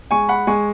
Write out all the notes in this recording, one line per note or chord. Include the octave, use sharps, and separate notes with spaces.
G#3 G#5 C#6
F#5 B5
G#3 G#5 C#6